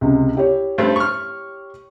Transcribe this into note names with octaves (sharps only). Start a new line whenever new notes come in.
C#2 C3
E4 G4 C#5
G2 A3 C4
C#6 F6